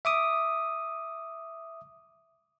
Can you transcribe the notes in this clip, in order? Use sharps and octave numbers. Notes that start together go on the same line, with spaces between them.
E5 D6 D#6